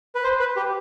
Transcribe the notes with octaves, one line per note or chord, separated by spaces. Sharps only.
B4
C5
B4
G4